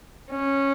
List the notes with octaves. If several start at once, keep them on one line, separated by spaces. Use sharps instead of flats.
C#4